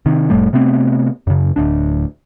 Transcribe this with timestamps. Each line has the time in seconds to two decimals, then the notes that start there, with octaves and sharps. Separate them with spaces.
0.06 C3 D#3
0.30 F1 A2 G3 A3
0.53 C3 A3 B3 C4
1.27 F#2 C#3
1.56 D1 D2 D4